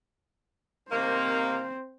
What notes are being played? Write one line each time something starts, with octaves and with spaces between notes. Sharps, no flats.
C3 D#3 A#3 C4 C5